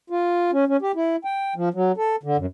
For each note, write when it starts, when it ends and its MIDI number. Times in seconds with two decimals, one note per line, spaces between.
0.10 0.51 65
0.52 0.65 61
0.67 0.77 61
0.82 0.92 67
0.95 1.16 64
1.25 1.54 79
1.56 1.69 53
1.74 1.92 54
1.97 2.16 69
2.23 2.37 50
2.37 2.46 42